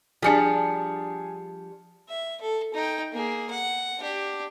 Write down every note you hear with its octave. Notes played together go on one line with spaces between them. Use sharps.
F3 G3 D4 G#4 G#5 C#7
E5
A4
D#4 G5
A#3 G#4
F#5
D4 G4